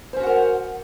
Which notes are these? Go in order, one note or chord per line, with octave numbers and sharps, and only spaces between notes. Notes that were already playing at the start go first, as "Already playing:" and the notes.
C#4 F#4 A#4 C5 F#5